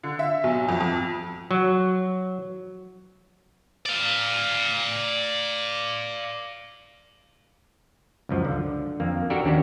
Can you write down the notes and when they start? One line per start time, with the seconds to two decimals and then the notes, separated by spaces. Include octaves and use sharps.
0.03 D3
0.19 E5
0.44 B1
0.68 F2
0.80 F2
1.51 F#3
3.86 D5 F5
8.29 C#2 F#2 F3
8.45 D3
9.00 F2 A#3
9.30 D4 F#4 G4 A4 A#4
9.44 D#2 C#4 D4 F#4 G4